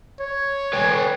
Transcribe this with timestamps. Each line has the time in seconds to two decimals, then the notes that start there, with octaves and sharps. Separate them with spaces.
0.20 C#5
0.73 B4 G5 G#5